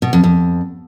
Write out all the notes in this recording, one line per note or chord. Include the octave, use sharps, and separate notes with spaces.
B2
F2
F2